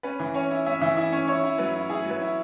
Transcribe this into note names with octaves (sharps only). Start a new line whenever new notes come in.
C#4 B4
E3
C#4 C#5
E4
C#4 E5
E3 E5
E4 E5
C#4 C#5
E4 C#5
E4
F#3 B4
E4
E4 G#4
F#3
B4
E4